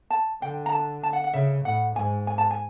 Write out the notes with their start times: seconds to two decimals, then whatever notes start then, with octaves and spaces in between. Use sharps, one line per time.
0.10 A5
0.42 D3 G5
0.66 A#5
0.72 A5
1.03 A5
1.13 F#5
1.24 F#5
1.34 C#3 E5
1.64 A2 F#5
1.96 G#2 G#5
2.27 G#5
2.38 A5
2.51 G#5